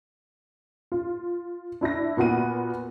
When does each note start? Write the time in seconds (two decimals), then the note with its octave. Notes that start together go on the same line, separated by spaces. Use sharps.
0.92 F4
1.81 D4 E4 E5 A#6
2.17 A#2 B3 F#4 F#5 D#7